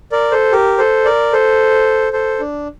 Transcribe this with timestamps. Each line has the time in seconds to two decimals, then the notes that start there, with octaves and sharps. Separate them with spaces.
0.12 A#4 D5
0.31 A4 C5
0.52 G4 A#4
0.78 A4 C5
1.05 A#4 D5
1.33 A4 C5
2.13 A4 C5
2.40 D4